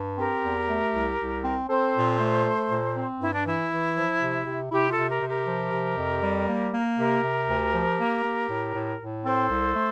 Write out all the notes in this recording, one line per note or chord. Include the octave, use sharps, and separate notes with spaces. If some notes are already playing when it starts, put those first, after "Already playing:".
Already playing: G2
C4 G4 A#4
E2
A3
C2
C2
C4
C4 A4 C5
A#2
A3
A3
A#2
C4
G2 E4
D4
E3 E4
E3
F3
C3
C3
C3 E4 G4
F4 A4
C3
G4 A#4
C3
G4 A#4
F3
C3
F2
G3
A#3
A#3
C3 G4 A#4
C3
D2
F3
A#3
A#3
A2
A2
A2
C4 A4 C5
C2
A3